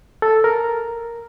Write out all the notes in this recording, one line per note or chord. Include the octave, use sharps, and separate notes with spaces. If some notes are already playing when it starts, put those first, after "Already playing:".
A4
A#4